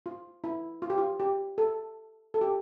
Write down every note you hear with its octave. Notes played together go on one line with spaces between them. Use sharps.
F4
E4
F4
G4
F4
G4
A4
A4
G4